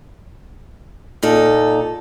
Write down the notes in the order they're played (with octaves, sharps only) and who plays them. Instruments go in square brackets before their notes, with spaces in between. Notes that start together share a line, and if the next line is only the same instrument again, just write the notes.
[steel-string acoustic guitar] A#2 D#4 A4